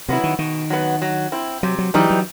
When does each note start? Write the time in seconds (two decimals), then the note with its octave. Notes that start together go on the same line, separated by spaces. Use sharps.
0.09 C3 F#3 B3 E4
0.24 D#3
0.39 B2 D#3
0.70 F#3 B3
1.02 F#3
1.32 C4 E4
1.63 C3 F#3
1.78 F#3
1.94 E3 F#3 G3 D#4
2.10 F#3